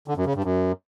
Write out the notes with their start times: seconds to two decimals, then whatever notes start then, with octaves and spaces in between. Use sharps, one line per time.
0.08 D3
0.17 F#2
0.26 C#3
0.35 G2
0.44 F#2